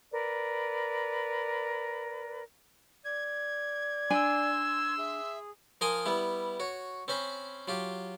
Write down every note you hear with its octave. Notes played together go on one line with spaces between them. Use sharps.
A#4 B4 D5
D5 G#6
D4 G#5 C6 E6
G#4 E5
F3 A#4 F5 G#5 C6 D#6
G3 B3 E4
F#4 C#5
C4 C#4 C5 B5
F#3 F4 G4